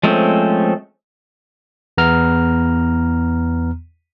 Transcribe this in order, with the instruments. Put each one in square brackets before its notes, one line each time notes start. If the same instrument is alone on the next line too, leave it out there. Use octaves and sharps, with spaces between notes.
[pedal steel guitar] F3 G#3 A3 C4 C#4
[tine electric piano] E2 B3 A#5 F6